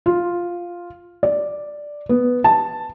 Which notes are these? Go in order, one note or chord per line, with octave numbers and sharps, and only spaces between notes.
F4
D5
B3
A5